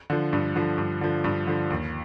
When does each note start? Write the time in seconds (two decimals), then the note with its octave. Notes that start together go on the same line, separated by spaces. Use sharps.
0.10 D3 F3
0.33 G2
0.56 D3 F3
0.78 G2
1.01 D3 F3
1.24 G2
1.47 D3 F3
1.70 D#2